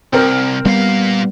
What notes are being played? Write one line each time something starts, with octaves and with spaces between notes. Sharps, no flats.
C2 C4 A#4
A#2 G3 B3 F5